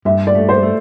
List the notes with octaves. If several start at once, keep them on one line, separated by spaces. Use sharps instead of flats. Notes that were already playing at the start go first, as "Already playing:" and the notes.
G2 E5
D5
A3
C5
A3